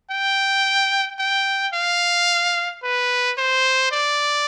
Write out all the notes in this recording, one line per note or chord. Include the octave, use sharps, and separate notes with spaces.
G5
G5
F5
B4
C5
D5